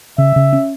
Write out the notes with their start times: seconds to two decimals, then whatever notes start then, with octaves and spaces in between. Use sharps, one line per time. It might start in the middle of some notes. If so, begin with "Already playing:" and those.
0.18 C#3 E5
0.36 C#3
0.53 C#4